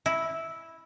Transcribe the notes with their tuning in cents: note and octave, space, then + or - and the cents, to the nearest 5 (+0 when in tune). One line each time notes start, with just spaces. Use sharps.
E4 -5